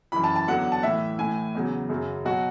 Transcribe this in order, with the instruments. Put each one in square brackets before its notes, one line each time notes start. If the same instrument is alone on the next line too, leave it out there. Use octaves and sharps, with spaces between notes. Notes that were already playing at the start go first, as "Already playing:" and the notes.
[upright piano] F#2 E3 B5
A5
A5
E2 D3 F#3 F#5
A5
A2 E3 E5
A2 E3 G#5
E2 C#3 F#3
F#2 C#3 F#3
B2 F#3 F#4